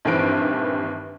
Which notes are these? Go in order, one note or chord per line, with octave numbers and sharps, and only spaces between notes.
A#1 G2 D#3 E3 C4 D7